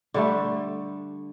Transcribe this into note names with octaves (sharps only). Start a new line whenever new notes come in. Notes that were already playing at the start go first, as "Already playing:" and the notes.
D3 G3 A3